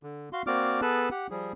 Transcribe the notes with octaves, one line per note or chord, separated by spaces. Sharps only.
D3
F#4 F5 C6
A#3 C4 F#4 D5 D6 F6
B3 G#4 A4 B4 A5 F#6
G4 F#5
F3 G3 G#4